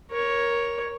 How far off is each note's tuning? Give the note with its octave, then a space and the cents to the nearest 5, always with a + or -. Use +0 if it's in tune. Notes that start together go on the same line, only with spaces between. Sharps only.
A#4 +15 C#5 +0